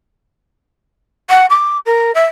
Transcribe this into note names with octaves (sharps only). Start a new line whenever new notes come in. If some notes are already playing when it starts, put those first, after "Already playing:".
F#5
D6
A#4
E5